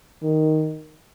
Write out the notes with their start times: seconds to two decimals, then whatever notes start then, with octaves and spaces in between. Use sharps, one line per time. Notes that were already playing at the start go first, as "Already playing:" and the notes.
0.23 D#3